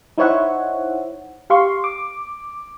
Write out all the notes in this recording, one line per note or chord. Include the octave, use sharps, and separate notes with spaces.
D#4 E4 C5 C#5 E5 F#5
G4 F5 C6 C#6
D6